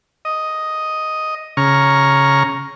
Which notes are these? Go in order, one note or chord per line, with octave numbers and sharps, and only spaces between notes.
D#5
C#3 A#5 C#6 F6